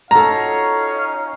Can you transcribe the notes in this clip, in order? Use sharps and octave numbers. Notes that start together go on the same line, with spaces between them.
C#4 D#4 F4 F#4 A4 F5 A#5